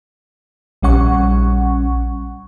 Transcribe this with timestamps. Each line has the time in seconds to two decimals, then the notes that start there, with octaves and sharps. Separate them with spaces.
0.82 A#1 G3 C#4 F#5 C#6